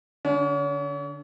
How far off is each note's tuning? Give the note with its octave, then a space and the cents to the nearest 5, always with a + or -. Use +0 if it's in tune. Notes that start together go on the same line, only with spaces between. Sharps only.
D3 +0 C#4 +40